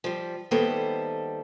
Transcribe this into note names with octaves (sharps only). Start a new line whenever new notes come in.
F3 G3
D#3 G3 A#3 B3 A4 C5